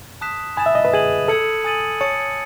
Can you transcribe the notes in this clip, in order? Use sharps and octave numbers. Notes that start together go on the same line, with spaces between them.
A5 D#6 F#6 B6 E7
G#5 B5 D#6 A6 E7
E5
D#5
B4
G#4 D#6 G#6 D#7 F#7
A4 A5 E6 G#6 C#7 F#7
G#5 D#6 A6 D#7 F#7
C#5 A5 D#6 A6 C#7